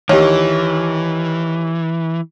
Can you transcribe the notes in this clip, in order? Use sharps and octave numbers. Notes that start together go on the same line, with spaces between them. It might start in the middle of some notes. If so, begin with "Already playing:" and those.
D#2 E3 G4 C#5